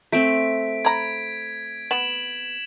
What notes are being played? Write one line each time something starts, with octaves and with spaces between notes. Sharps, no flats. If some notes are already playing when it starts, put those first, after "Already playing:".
A3 C4 B6 D7
A#5 B5 G#6
B3 E7 F#7